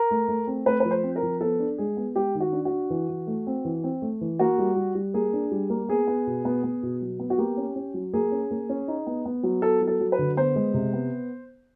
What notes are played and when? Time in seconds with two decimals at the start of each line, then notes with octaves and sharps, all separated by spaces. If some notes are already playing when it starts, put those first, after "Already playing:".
Already playing: A#4
0.11 A3
0.28 A3
0.47 C4
0.66 A3 B4
0.80 F3 B4
0.91 C5
1.03 C4
1.16 A#4
1.23 F3
1.41 B3 A4
1.60 D4
1.78 G#3 G#4
1.97 B3
2.16 G#3 G4
2.35 D#3
2.40 F#4
2.53 D4
2.65 F#4
2.71 D4
2.90 E3
3.09 E3
3.27 A3
3.47 C4
3.65 E3
3.84 C4
4.02 A3
4.21 E3
4.39 A#3 F#4
4.58 G3
4.77 G3
4.95 G3
5.14 A#3 G#4
5.33 D4
5.51 G3
5.70 A#3
5.89 B3 G#4
6.07 B3
6.27 B2
6.45 B3
6.64 B3
6.83 B2
7.02 F#3
7.19 B3
7.30 F#4
7.38 A#3 G4
7.57 C#4
7.76 C#4
7.94 F#3
8.13 A#3 G#4
8.32 C#4
8.51 A#3
8.69 C#4
8.88 D#4
9.07 B3
9.25 B3
9.43 F#3
9.62 B3 A4
9.82 F#3
9.87 A4
10.00 F#3
10.12 B4
10.19 D3
10.37 B3 C5
10.56 G#3
10.74 C3
10.93 B3